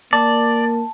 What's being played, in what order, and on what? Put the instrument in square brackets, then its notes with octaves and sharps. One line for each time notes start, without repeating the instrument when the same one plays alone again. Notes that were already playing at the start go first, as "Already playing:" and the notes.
[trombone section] A#3 [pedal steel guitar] D5 [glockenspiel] A5